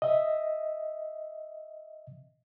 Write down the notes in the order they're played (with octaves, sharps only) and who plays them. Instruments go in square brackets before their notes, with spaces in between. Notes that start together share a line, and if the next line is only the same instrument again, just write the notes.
[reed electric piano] D#5 E5